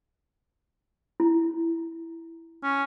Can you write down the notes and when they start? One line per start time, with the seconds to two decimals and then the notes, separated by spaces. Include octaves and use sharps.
1.20 E4
2.64 C#4